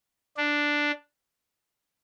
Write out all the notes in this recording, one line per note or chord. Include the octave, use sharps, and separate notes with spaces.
D4